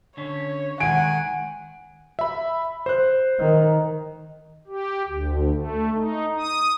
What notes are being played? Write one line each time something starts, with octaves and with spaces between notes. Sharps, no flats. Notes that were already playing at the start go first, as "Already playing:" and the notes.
D3 C#4 C#5
D#3 G#3 F#5 G#5 D7
E5 B5
C5 F#6
D#3
G4
D2
A3
D#4
D#6